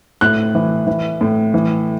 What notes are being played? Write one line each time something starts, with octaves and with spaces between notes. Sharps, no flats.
A2 F#6
E3
E3
A2
E3